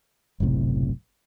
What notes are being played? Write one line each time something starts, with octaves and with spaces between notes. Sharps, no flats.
F#1 B1 A2 C3